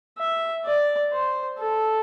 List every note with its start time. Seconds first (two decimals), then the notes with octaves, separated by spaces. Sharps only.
0.18 E5
0.65 D5
1.12 C5
1.59 A4